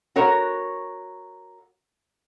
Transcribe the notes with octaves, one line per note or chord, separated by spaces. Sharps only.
F#4 A#4 C#5